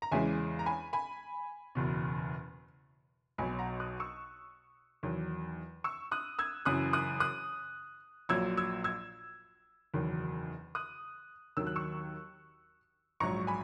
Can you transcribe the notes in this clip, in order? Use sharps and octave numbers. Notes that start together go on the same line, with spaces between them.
A#5
E2 C#3 E3 G#3 E5 G#5
A#5
G#5 B5
G#5 B5
F#1 E2 B2
B1 B2 F#3 G#5 B5
F#5 A#5
D#6 F#6
C#6 E6
E2 D#3 F#3
C#6 E6
D#6 F#6
E6 G#6
F#1 F#2 E3 D#6 F#6
D#6 F#6
D#6 F#6
A#1 A#2 F#3 E6 G#6
E6 G#6
E6 G#6
F#1 E2 D#3 F#3
D#6 F#6
D#2 D#3 F#3 E6
F#6
C#6 E6
A#1 G#2 F#3 A#5 C#6
G#5 B5